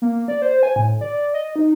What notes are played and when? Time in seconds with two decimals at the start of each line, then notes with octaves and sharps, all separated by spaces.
0.02 A#3
0.28 D5
0.42 C5
0.63 G#5
0.76 A2
1.01 D5
1.34 D#5
1.56 D#4